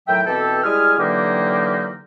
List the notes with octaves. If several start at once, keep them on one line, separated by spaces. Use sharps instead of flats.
A2 D#3 F#3 E5 G5
B2 E3 C4 G4 A4
G3 G#3 E4 G#5 D#6 F6
D3 E3 F#3 A#3 D#4 G4